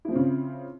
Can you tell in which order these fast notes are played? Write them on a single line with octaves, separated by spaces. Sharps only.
E4 F3 C4 C#3